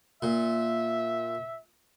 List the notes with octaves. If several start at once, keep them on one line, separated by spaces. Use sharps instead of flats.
A#2 E5